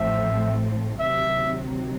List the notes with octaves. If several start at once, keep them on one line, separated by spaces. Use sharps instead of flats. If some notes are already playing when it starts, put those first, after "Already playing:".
Already playing: A1 A2 F3 A3 C4 E5
D2 C3 D#3 F#3 E5